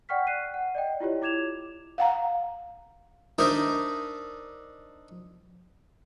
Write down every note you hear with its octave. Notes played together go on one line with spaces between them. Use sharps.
D5 F#5 G5 C#6 F6 B6
F#6 C7 D#7
F#5
D5 D#5 G5
E4 F4 G4 C#5
E4 D6 G#6 E7 F7
F5 F#5 A#5
D4 D#4 A#4 C5 D#5 E5